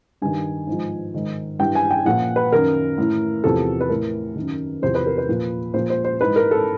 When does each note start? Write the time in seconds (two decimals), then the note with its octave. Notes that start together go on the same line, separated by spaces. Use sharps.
0.22 G2 D#3 G#5
0.67 G#2 F3
1.14 G#2 D#3
1.59 G2 E3 G5
1.75 G#5
1.91 G5
2.05 A#2 F3 F#5
2.36 B4
2.52 F#2 D#3 A#4
2.98 A2 E3
3.44 E2 C3 F3 A4
3.81 B4
3.90 A2 E3 A#4
4.36 F#2 D#3
4.82 E2 C3 F3 C5
4.95 B4
5.06 A#4
5.18 B4
5.29 A#2 F3
5.74 A#2 F3 C5
5.90 C5
6.05 C5
6.21 G#2 E3 B4
6.36 A#4
6.51 A4